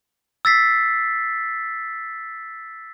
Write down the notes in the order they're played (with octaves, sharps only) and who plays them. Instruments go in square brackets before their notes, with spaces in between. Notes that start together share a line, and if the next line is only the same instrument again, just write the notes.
[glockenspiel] E6 A6 B6 C7